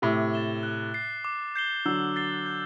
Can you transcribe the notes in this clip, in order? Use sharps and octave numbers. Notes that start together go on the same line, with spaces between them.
A2 C3 D6
A6 E7 G7
F#6
A6 C7
D6
G6 C7 G7
D3 F#3 E6
A6 C7 G7
G6